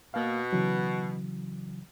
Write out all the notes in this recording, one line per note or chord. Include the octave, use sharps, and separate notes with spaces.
B2 A#3 F5
C#3 E3 F#3